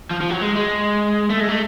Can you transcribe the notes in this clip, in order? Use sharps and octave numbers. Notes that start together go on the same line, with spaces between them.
F3
F3
F#3
G#3
G#3
A3
G#3
A3